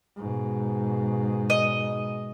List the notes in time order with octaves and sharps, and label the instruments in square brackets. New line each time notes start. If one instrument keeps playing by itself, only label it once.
[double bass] G#2 B2
[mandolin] D#5